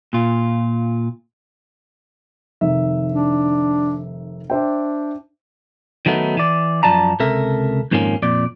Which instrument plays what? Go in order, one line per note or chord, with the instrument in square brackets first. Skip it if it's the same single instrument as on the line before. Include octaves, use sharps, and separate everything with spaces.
[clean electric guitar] A#2 F4
[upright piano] F1 D#3 E5
[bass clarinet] D4
[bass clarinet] D4 [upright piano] C5 E5 G5
[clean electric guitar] D#3 F#3 A3 B3 D#4
E3 D5
F#2 F3 D5 A5 A#5
C#2 C3 A4 A#4 E5
F2 G#2 D#3 F3 A#3 C#4
F2 A#2 D5